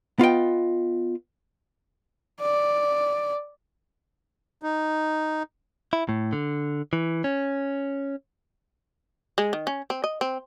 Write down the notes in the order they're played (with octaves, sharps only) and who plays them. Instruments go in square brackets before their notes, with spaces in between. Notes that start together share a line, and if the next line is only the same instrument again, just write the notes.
[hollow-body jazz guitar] B3 F4 D#5 G5
[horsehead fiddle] D5
[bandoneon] D#4
[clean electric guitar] E4
A2
D3
E3
C#4
[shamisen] G#3
D#3
C#4
C4
D#5
C4